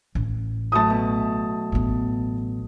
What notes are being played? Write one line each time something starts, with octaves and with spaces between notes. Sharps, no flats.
A1
E3 F#3 A3 A5 D#6
B2
A1 B3